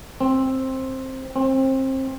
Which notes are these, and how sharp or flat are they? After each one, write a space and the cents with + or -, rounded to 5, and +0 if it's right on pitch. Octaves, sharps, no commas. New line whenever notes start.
C4 +10
C4 +25